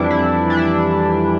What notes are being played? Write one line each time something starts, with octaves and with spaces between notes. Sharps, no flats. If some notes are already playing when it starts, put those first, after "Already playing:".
Already playing: F2 E3 G3 D4 E4
E4
D4
E4